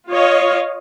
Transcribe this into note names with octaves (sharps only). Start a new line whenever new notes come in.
F4 C#5 D#5 F5